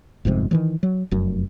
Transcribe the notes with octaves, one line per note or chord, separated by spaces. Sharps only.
G1 F2 G#2 C3
D#3 E3 F#3
F#3
F1 F#2